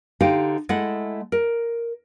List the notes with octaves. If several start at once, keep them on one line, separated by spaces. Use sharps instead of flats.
D3 D#4 G4 C5 F5 G5
G#3 A3 E4 F#5
A#4